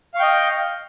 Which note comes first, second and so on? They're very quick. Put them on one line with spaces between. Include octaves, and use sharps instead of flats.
F5 C#6 G5 D#5